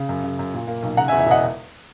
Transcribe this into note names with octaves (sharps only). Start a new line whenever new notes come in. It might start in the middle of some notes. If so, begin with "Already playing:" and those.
Already playing: C#3
F#2
C#3
F#2
A#2
A#3
B1
C#3 F#5 A#5
E5 G#5
E2
E5 G#5
E1 D#5 F#5